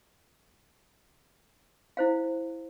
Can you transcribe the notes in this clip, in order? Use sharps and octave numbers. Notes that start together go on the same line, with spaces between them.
E4 C5 F5